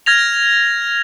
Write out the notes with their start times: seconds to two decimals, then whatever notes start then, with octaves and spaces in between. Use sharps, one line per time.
0.06 F6 G#6 A#6 F7